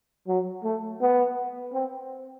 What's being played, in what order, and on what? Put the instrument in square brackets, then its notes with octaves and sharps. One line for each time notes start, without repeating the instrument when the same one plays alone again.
[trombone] F#3
A3
B3
C4